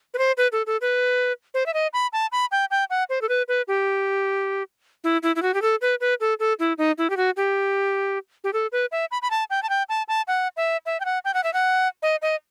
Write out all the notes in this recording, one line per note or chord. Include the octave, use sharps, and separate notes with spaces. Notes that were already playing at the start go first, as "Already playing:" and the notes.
B4
C5
B4
A4
A4
B4
C5
E5
D#5
B5
A5
B5
G5
G5
F#5
C5
A4
B4
B4
G4
E4
E4
E4
F#4
G4
A4
B4
B4
A4
A4
E4
D#4
E4
G4
F#4
G4
G4
A4
B4
E5
B5
B5
A5
G5
A5
G5
A5
A5
F#5
E5
E5
G5
F#5
G5
F#5
E5
F#5
D#5
D#5